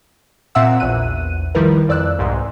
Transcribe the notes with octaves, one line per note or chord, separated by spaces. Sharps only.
A#2 C4 E5 F#5 E6
A#1 E2 F#6 D#7
D#3 F3 G3 E4 A#4 B4
F2 D5 E6 F#6
C2 G#2 C6